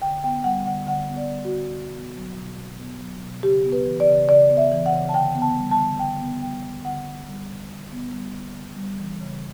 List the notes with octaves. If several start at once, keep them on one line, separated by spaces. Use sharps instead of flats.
D3 G5
B3 G5
G3 F#5
D3 F#5
D3 F#5
B3
D5
G3
F#4
D3
B2
B3
F#3
B2
B2
B3
F#3
B2
C#3 G4
B3
B4
E3
D5
C#3
C#3 D5
B3
E5
E3
F#5
C#3
A5
D3 G5
B3
A5
G3
A5
D3
D3 G5
B3
G3 G5
D3
D3 F#5
B3
G3
D3
D3
B3
G3
D3
C#3
G3
E3
C#3